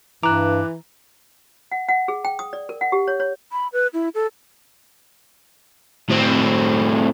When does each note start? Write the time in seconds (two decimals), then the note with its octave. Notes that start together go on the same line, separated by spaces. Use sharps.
0.23 G2 E3 A#5 D6 F#6
1.72 F#5
1.88 F#5
2.08 G#4
2.25 G5
2.39 D#6
2.53 D5
2.69 A#4
2.81 F#5
2.92 G4
3.08 C#5
3.20 C#5
3.52 B5
3.73 B4
3.94 E4
4.15 A4
6.10 A2 C4